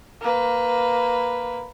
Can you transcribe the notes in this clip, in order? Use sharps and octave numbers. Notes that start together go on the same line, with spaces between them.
A#3 B4